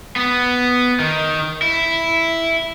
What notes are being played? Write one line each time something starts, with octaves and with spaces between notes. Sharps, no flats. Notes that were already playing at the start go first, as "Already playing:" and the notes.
B3
D#3
E4